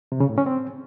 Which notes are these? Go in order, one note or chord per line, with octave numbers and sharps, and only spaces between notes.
C3
C#3
A2
C#4
C4